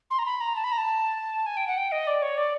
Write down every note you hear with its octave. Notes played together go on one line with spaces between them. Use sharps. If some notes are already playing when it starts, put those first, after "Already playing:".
C6
A#5
B5
A#5
A5
B5
A#5
A5
G#5
G5
F#5
G5
D#5
D5
C#5
D5